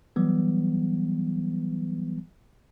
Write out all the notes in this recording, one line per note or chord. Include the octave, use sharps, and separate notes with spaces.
E3 F#3 G3 B3